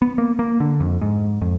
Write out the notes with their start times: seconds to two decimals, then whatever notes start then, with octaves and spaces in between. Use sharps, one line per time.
0.02 B3
0.18 A#3
0.39 A#3
0.60 D3
0.80 F2
1.01 G#2
1.41 F2